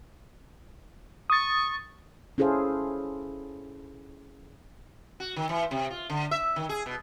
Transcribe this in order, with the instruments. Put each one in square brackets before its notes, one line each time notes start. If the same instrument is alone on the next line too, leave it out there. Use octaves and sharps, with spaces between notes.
[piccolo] C#6 [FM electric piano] D#6 A6
[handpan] C#4 E4 G#4 A4 C5 F5
[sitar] F#4
D#3
E3
C3
F4
D3
E5
D#3
G#4
B2